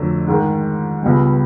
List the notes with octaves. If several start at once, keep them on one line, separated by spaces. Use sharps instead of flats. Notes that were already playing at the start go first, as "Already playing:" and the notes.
Already playing: F2 D3 F#3 A3 D4
G#2 D#3 G#3
C#2 B2 G3